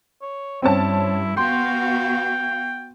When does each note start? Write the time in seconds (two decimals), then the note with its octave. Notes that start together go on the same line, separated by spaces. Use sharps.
0.22 C#5
0.62 G2 C4 C#4 E4 A5
1.37 B3 F#4 F5 G5 C6